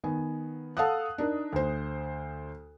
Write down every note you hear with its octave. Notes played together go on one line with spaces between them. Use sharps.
D#3 B3 G#5
A4 F5 F#5 A5 D#6 F#6
D4 D#4 A#4
D2 C5